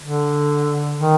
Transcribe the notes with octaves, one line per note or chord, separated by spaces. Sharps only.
D3
D#3